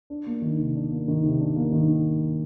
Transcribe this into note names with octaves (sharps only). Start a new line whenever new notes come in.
D4
A#3
D#3
C3
D4
A#3
D#3
C3
D4
A#3
D#3